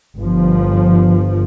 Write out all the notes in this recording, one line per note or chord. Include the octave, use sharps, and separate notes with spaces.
G1 F3